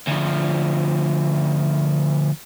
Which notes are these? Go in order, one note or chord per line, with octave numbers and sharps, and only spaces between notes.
D2 F3